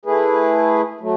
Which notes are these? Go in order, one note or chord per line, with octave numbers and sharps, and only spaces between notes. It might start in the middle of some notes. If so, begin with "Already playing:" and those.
A3 E4 G#4 B4
F#3 A3